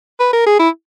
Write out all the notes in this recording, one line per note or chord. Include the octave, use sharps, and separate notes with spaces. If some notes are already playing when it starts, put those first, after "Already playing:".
B4
A#4
G#4
E4